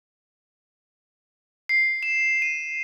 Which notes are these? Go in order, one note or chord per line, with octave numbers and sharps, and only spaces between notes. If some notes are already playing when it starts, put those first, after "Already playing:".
C7
E7
D#7